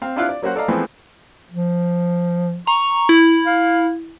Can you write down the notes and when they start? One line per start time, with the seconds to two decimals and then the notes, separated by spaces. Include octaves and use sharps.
0.02 C4 F5
0.16 D4 E4 F4 F5 F#6
0.29 D5
0.42 F#3 A#3 C#4 F#4 C5 F#5
0.56 A4 D5 D#5 F5 A#5
0.68 E3 F3 G#3 A3 B3 C4
1.50 F3
2.67 A#5 C#6
3.09 E4
3.46 F5